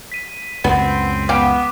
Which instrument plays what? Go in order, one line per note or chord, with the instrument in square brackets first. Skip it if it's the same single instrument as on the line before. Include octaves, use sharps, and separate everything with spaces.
[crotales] B6 D#7
[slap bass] C#2 F#2 [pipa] B3 [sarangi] C4
[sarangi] B3 [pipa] F5 G5 [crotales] D6